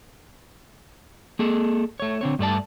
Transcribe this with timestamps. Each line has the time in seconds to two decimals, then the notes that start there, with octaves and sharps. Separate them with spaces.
1.39 A#3 G#4 A4
2.00 A3 C#5
2.21 D3 C4 C#5
2.39 G2 A3 D5 A5